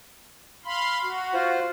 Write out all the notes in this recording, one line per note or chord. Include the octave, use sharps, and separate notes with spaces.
F5 B5 C6
F#4
F4 C5